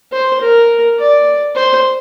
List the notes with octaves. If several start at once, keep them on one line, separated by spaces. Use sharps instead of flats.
C5
A#4
D5
C5